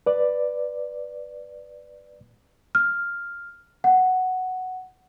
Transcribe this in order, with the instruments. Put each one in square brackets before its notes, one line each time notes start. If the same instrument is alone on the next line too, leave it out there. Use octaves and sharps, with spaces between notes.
[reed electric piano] B4 D5
[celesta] F6
F#5